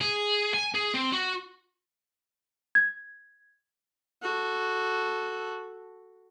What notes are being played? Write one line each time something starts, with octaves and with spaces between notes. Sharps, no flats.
G#4
G#5
G#4
C4
F#4
G#6
F#4 A4